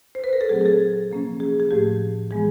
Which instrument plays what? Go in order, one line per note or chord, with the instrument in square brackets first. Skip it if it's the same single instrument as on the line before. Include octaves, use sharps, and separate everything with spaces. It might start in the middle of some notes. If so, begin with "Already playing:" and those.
[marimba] C5
B4
A#4
A4
A#2 F#3 A3 C4 G#4
G#4
A4
C3 F3 A#3 C#4
G#4
G#4
A2 F3 A3 G4
E3 G#3 B3 G#4